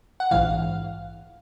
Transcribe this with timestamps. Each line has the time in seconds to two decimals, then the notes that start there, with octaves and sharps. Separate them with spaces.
0.20 F#5
0.31 A#1 G#2 E3 F5